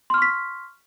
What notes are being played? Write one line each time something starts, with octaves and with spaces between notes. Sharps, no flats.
C6 C#6 F6 B6